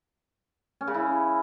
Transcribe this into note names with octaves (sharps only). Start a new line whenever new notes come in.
C#4
C#3
E4